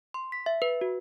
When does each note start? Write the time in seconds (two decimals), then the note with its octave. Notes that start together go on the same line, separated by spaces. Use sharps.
0.14 C6
0.32 B6
0.46 E5
0.62 B4
0.81 F#4